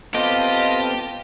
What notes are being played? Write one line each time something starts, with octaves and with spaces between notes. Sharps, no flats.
B3 C4 F4 G4 A4 D#5